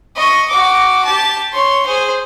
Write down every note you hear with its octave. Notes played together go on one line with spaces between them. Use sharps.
D#5 C#6
F#4 D6
G4 A5
C#5 C6
G#4 C5